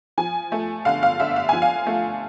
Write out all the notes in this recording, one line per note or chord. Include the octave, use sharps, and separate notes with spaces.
F3 G#5
A3
D3 F5
F5
D3 E5
F5
F3 G#5
F5
A3